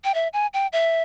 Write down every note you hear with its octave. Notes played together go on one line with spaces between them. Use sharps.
G5
E5
G#5
G5
E5